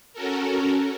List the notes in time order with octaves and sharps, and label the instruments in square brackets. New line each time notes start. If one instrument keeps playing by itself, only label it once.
[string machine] C#4 F#4 A4 A#4